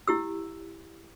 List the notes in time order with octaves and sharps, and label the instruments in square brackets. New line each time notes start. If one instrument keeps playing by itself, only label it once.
[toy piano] E4 G4 E6